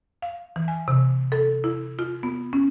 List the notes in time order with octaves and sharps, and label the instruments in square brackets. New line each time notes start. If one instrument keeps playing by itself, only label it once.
[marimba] F5
E3
G#5
C3
A4
E4
F4
B3
C#4